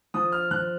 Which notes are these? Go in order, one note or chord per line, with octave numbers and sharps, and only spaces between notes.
F3 D#6
F6
F3 F#6